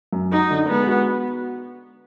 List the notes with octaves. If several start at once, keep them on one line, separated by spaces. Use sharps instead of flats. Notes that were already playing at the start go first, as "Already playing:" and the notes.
F#2
D#4 F#4
D3
G#3 B3
F#4